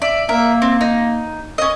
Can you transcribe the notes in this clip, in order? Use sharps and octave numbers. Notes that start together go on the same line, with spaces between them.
D5 E5
A#3 A#4 E5
C4
D#4
C#4 D#5